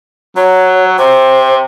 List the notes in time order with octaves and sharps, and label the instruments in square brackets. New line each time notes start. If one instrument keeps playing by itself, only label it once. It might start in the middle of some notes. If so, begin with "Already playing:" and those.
[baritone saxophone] F#3 [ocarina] C#5
[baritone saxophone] C3 [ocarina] C5